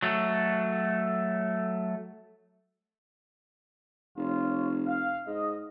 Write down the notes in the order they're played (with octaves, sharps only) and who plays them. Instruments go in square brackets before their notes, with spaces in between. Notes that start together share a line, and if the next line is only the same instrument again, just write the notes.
[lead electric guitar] F#3 A3
[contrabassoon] F1 [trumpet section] F4 C#5
[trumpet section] F5
[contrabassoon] G#2 [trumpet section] D#5